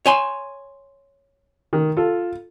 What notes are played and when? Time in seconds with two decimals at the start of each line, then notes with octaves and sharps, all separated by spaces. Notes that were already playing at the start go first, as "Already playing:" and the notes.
0.06 C#5 G#5 C6
1.73 D#3
1.97 F4 A4